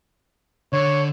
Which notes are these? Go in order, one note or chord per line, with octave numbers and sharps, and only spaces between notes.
D3 C#5